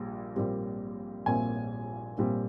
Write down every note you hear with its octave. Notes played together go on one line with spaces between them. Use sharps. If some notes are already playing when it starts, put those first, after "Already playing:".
Already playing: A#1 A#2 G3
A#1 A#2 G3 C4
A#1 A#2 G3 C4 G#5
A#1 A#2 G3 C4